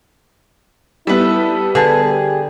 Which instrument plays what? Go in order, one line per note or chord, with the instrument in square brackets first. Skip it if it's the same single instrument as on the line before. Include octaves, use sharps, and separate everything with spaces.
[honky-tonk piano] G3 B3 [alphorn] E4 [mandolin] A4 B4
[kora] D3 [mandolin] G#4 A5 [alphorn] B4
[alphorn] G4